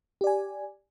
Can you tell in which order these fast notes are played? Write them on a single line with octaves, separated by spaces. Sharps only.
G4 D5 G#5